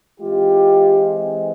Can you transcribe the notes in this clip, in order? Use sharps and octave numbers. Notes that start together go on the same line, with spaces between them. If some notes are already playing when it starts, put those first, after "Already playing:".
E3 G#3 C4 F4 G4